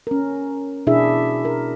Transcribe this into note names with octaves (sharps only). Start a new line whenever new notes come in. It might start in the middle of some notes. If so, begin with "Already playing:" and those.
C#4 A#4
B2 D4 E4 G#4 E5
A#4